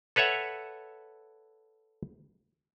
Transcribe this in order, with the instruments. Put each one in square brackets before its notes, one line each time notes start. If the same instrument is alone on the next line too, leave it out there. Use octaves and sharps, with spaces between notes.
[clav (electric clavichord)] A4 B4 C#5 E5 F#5